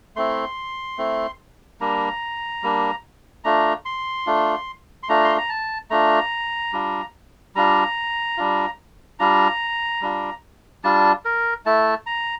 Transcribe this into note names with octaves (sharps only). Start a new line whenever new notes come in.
A3 C4 E4 C6
A3 C4 E4
G3 A#3 D4 A#5
G3 A#3 D4
A3 D4 F4 A#5
C6
A3 D4 F4
C6
A3 D4 F4 A#5
C6
A#5
A5
A3 D4 F4 A#5
G3 D4 F4
G3 D4 F4 A#5
G3 D4 F4
G3 D4 F4 A#5
G3 D4 F4
G3 D4 F4 A5
A#4
A3 E4 A5
A#5